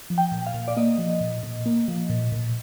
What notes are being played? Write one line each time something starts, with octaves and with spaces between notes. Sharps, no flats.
F3
G5
A#2
F5
A#2
D5
A#3 D#5
F3
A#2
A#2
A#3
F3
A#2
A#2